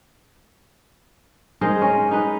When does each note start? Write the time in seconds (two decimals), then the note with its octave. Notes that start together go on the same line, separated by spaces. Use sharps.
1.61 G#3 D#4 A#4 C5
1.82 C#4
2.11 D#4 B4